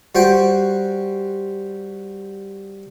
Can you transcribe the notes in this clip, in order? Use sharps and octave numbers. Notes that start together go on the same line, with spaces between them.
G3 F#4 C5 F#5 G5